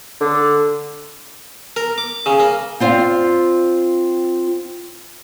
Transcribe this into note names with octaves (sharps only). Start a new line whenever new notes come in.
D3
A#4
D6
C#3
A#3
C4 F4 C5 D5 F5